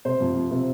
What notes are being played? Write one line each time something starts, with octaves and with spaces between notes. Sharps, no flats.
C3 C5
F2
F2
C3